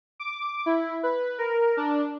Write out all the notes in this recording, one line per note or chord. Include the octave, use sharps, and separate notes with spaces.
D6
E4
B4
A#4
D4